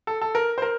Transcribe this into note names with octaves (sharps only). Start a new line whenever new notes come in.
A4
A4
A#4
C5
A#4